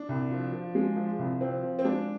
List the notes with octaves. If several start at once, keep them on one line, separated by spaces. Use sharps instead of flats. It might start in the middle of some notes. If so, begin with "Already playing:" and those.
Already playing: D4
C2
F3
F3
G#3
F3
C2
F3 C4
F3
C4
G#3 D4